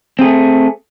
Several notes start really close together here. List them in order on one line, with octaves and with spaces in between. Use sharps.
C4 G#4 A3